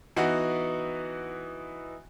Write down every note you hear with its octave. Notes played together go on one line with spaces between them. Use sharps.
E3 B3 D#4 F#4